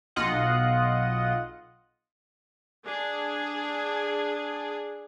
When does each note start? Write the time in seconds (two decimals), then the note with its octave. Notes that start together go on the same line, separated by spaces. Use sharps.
0.16 B1 F4 D#5 F#5
2.86 D4 G#4